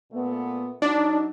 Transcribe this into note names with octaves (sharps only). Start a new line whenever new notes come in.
A#2 A3 B3
F#3 D4 D#4